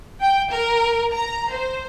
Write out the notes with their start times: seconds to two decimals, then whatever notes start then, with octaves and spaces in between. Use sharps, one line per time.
0.21 G5
0.51 A#4
1.14 A#5
1.53 C5